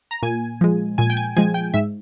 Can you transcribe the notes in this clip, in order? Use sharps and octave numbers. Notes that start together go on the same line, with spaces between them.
A#5
A#2 G#5
F3 G#3
A#2 G#5
G5
G#5
F3 G#3 G#5
G5
G#2 E5